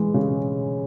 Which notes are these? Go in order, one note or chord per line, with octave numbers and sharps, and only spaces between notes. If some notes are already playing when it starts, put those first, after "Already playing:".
Already playing: E3 G#3
C#3